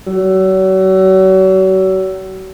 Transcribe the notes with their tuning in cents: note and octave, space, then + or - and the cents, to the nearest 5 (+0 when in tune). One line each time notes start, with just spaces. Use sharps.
F#3 +40